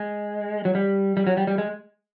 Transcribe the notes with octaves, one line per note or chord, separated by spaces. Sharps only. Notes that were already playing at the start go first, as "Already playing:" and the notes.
Already playing: G#3
F#3
G3
G3
F#3
G3
G3
G#3